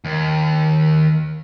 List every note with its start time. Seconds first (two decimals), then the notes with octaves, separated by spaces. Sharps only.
0.05 D#2